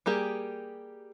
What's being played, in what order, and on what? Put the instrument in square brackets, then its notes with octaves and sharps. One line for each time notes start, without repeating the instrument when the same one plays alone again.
[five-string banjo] G3 A#3 G4 G#4